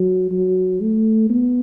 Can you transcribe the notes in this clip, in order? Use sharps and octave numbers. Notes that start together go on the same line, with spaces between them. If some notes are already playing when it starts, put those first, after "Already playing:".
Already playing: F#3
F#3
A3
B3